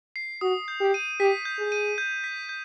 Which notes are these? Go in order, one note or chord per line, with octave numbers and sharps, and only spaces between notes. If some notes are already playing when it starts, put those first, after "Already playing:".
C7
F#4 D#6
G6
G4
D#7
G4 B6
G6
G#4
D#7
G6
B6
G6